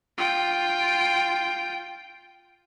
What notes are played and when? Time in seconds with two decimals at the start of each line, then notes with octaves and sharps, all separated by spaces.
0.18 F4 G5